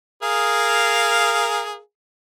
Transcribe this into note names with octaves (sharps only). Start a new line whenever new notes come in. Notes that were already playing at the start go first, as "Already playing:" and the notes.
G#4 A#4 F5